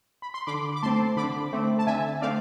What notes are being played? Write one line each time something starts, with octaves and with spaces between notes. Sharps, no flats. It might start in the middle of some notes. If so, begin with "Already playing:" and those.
B5
C6
D3 B5 D6
D6
A3 C4 A5 C6
D3 B5 D6
A3 C4
A5
D3 E5 G#5
A3 C4 D5 F5